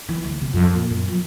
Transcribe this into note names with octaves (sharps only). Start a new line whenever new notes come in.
E3
D2
C3
F2
A#2
F#2
F3